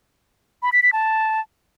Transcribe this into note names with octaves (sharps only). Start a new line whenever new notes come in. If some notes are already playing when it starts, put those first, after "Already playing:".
B5
B6
B6
A5